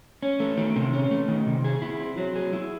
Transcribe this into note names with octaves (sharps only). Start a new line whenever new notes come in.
C#4
A3
D#3
C3
C#4
A3
D#3
C3
G#4
E4
C4
F#3
G#4
E4